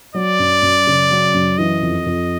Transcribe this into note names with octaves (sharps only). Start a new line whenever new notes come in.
F#3 D5
F#2
F#2
C#3
F#3
F#2
E3 D#5
F2
F2